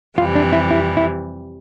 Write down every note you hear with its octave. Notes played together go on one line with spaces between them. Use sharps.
F2 C3 E3 G3 F4
D4
E4
E4
E4